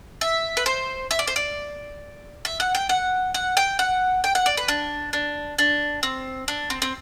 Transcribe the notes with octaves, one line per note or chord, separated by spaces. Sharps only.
E5
B4
C5
E5
D5
C5
D5
E5
F#5
G5
F#5
F#5
G5
F#5
G5
F#5
D5
B4
D4
D4
D4
C4
D4
C4
C4